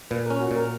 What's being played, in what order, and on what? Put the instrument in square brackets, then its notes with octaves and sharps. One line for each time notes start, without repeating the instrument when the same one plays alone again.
[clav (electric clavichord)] A#2 [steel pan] B4
[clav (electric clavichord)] C#4 [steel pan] A#4
[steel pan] F#4
[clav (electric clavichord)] A#2
[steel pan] A#4